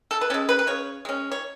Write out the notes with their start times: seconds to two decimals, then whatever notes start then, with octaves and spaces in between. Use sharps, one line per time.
0.11 A4
0.21 B4
0.30 G#3 C#4 A4
0.49 B4
0.59 B4
0.67 C#3 C#5
1.05 G#3 C#4
1.32 C#5